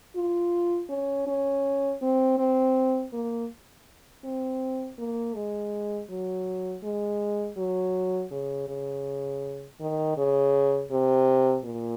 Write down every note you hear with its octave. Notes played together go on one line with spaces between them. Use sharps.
F4
C#4
C#4
C4
C4
A#3
C4
A#3
G#3
F#3
G#3
F#3
C#3
C#3
D#3
C#3
C3
A#2